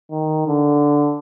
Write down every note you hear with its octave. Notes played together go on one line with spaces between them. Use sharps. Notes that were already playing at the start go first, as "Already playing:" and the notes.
D#3
D3